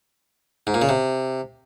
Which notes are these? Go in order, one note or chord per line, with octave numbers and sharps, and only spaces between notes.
G#2
A#2
C#3
C3